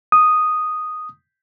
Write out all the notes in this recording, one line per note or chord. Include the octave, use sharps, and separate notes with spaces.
D#6